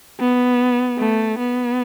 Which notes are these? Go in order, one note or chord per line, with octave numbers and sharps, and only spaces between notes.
B3
A3
B3